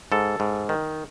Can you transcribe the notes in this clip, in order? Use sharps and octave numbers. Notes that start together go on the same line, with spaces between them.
G#2 A4
G#2
D#3